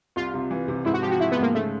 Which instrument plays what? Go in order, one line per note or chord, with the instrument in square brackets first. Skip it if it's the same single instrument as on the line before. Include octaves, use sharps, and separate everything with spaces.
[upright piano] C2 [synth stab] F4
[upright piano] C3
E3
C3
[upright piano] G#2 [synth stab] E4
[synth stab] F#4
[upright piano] F3 [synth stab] G4
[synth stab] F#4
[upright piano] F3 [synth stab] E4
[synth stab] B3
[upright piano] G#2
[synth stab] A#3
[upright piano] C#3 [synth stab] A3